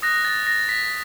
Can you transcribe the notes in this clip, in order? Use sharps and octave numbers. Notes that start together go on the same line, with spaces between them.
D#6 F#6 A#6
A6
A#6
B6